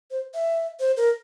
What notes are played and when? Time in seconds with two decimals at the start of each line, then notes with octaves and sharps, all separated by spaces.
0.11 C5
0.34 E5
0.80 C5
0.97 A#4